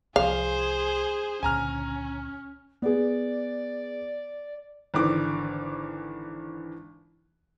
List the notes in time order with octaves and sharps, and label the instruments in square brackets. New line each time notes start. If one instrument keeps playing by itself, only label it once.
[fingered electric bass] C2 F3 [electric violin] G#4 C5 [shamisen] F5
[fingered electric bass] C#2 A#2 D3 [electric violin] C#4 [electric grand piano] G#5 A#5 F6
[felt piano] B3 G#4 [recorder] D5
[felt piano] G#1 D3 E3 D6